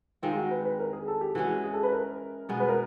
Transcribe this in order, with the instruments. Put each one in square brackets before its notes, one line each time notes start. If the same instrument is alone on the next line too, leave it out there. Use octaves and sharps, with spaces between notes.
[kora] D#3 G#3 C4 [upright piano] F4
[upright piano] F#4
B4
B4
A#4
G#4
A4
G4
[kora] E3 G#3 C#4 [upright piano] F#4
[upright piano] G#4
A4
B4
A#4
[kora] B2 G#3 B3
[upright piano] B4
A#4